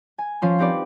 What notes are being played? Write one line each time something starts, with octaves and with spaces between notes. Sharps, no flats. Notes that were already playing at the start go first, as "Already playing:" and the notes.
G#5
F3 C#4 C6
C4 D#4 G4 B4 D5